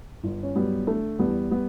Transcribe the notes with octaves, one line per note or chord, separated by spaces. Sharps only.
G1
C#4
F#3 G3 B3
D3 A3
E2 G3 B3
G3 B3